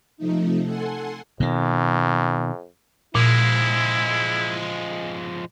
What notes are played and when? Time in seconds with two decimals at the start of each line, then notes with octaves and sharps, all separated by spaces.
0.17 C3 F3 A3 D#4
0.63 A4 F#5 G#5 C6
1.40 F2 B2 D#3
3.15 A#2 F3 G#3 E4